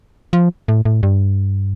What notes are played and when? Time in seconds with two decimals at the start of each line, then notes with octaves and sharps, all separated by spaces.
0.33 F3
0.68 A2
0.85 A2
1.03 G2